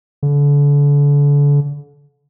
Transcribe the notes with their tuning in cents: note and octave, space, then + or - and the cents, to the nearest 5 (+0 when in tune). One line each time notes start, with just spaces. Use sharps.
D3 -35